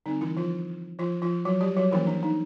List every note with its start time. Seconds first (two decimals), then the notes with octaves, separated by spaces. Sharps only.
0.06 D3 G3 C4 D#4
0.21 E3 E4
0.37 F3 F4
0.99 F3 F4
1.22 F3 F4
1.45 F#3 F#4
1.61 G3 G4
1.77 F#3 F#4
1.92 E3 F3 A#3 C#4 E4
2.07 D4
2.23 D#4